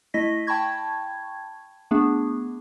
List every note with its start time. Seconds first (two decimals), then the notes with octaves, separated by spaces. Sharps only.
0.14 A3 E4 D#5 A#6 B6
0.47 G5 A5 B5 C#6 G#6
1.91 A3 B3 D4 G#4